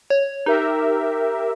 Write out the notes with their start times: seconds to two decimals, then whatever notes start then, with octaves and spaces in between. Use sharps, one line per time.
0.10 C#5
0.46 D#4 G4 A#4 E5